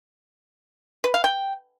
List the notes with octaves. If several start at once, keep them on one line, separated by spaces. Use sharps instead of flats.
B4
F5
G5